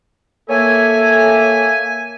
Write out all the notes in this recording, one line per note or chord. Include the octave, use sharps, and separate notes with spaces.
A#3 A4 C#5 E5 G#5